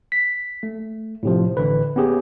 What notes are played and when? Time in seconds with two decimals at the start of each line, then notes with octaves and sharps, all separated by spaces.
0.12 B6
0.63 A3
1.23 A2 C3 F3
1.57 A1 D3 B4
1.96 B3 C#4 G4 G#4